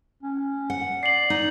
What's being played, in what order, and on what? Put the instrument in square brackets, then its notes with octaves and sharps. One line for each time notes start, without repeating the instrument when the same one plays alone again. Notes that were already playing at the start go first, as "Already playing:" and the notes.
[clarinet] C#4
[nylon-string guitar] F#5
[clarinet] D5 [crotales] C7 F#7
[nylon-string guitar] D#4